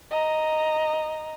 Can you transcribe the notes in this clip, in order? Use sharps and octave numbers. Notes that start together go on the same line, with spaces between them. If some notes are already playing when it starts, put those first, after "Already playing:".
D#5 A#5